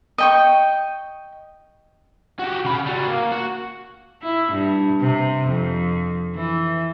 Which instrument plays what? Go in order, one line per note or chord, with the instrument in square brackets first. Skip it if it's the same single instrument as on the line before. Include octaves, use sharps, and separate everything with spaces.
[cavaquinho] D#5 G5 C#6
[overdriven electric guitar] F#4 G4
C#3 B5
G3 F#4
A#3
F#4
[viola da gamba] E4
G2
C3
F2
E3